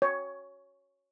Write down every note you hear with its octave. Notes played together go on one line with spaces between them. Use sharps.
C#5